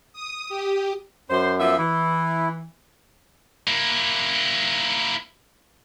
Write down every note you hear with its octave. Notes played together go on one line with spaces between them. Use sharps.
D#6
G4
F#2 C5
F3 B3 E5
E3 E4
A#3 E4